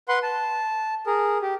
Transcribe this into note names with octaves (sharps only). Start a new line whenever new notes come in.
B4 F#5 C6
A5
G#4 A#4
G4